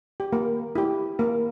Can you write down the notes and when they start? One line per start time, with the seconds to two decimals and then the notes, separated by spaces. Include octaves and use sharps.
0.20 G4
0.33 A#3 A#4
0.75 E4 G4
1.19 A#3 A#4